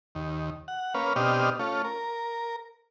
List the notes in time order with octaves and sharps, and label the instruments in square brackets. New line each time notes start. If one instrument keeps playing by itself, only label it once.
[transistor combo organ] D#2
F#5
A#3 C#4 B4 F5
B2 C4 D4 G4 D#5 F6
A3 C#4 F4
A#4